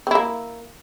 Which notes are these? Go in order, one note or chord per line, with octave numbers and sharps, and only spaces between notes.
A#3 C4 E4